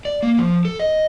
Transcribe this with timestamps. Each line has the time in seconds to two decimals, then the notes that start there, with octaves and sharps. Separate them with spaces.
0.05 D5
0.23 A#3
0.39 F3
0.65 A4
0.79 D#5